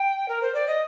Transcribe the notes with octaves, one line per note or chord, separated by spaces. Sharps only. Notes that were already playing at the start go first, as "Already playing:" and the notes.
Already playing: G5
A#4
C5
D5
D#5